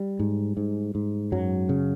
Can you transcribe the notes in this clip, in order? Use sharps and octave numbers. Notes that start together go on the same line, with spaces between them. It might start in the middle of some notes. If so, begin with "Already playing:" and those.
Already playing: G3
G#2
G#2
G#2
F#2 F#3
C#3